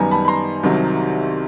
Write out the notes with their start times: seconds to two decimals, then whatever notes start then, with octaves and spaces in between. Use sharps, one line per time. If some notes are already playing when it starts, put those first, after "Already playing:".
Already playing: F#2 D#3 G3 B3 G#5 A#5
0.11 A5 B5
0.25 B5
0.28 A#5 C6
0.63 C2 C3 D#3 F#3